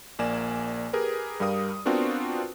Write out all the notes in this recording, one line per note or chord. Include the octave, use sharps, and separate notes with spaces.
A#1 A#3 D5 G#5 E7
G4 G#4 A#4 B4
G2 G3 A#4 F5 D#6
B3 C4 D4 F4 F#4 A#4